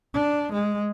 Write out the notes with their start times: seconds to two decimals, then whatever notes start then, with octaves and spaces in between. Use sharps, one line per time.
0.14 D4
0.53 G#3